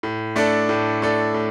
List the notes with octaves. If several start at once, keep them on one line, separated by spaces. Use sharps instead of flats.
A2
A3 D4 A4 D5
A2
A3 D4 A4 D5
A2